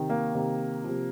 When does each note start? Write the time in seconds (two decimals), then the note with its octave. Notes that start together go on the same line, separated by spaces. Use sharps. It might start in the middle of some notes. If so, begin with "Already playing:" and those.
Already playing: C3 D#3
0.10 A#3
0.34 C3 D#3
0.84 C3 F3